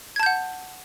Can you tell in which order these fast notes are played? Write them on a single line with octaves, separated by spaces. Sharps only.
G#6 A5 G6 F#5